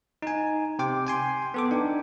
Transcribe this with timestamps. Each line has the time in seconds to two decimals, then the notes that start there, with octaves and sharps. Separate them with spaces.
0.22 D#4 G#5
0.79 C3 G5 D6
1.07 G5 G#5 C6
1.54 B3 A4 D6
1.71 D4 D#4 G5